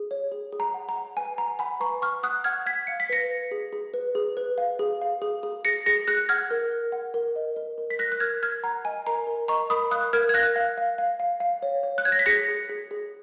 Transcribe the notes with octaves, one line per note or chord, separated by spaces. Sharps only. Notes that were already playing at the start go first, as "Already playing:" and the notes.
Already playing: G#4
C#5
G#4
G#4
A#5
F#5
A#5
F#5
B4 G#5
F#5 A#5
F#5 G#5 B5
B4 A#5 C#6
F#5 C#6 F6
F#5 D#6 F#6
F#5 F6 G#6
F#5 G#6 B6
F5 C#7
B6
B4 A#6 C#7
B4
G#4
G#4
B4
G#4
B4
F5
G#4
F5
G#4
G#4
G#4 A#6 C#7
G#4 A#6 C#7
G#4 F#6 A#6
F#5 F6 G#6
A#4
A#4
F#5
A#4
D#5
A#4
A#4
B6
A#4 F#6 A#6
F#6
A#4 F6 G#6
A#4 F6 G#6
F#5 A#5
D#5 G#5
A#4 A#5
A#4
D#5 A#5 C#6
A#4 B5 D#6
F5 D#6 F#6
A#4 F6 G#6
G#6
F5 F#6 A#6
F5
F5
F5
F5
F5
C#5
C#5
F#6
C#5 G#6
A#6
B6
G#4 A#6 C#7
G#4
G#4
G#4